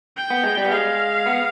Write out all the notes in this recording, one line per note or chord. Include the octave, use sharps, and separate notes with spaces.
G5
B3
G#3
G3
B3
G#3 F5
B3